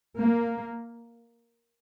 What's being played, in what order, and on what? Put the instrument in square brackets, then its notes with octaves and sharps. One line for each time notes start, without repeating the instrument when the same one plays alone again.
[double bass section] A#3